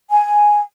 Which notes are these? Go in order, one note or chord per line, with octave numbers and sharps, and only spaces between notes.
G#5